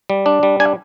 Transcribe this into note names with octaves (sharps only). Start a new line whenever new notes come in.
G3
D4
G3
D4 G#5